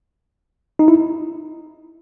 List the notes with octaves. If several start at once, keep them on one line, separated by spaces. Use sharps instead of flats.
D#4
E4